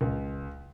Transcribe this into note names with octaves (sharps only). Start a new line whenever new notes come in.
C#2